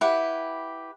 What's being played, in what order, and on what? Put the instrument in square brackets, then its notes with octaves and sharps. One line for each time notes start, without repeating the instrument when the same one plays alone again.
[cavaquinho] E4 G4 B4 F#5